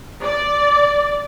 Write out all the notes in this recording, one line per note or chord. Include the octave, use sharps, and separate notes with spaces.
D5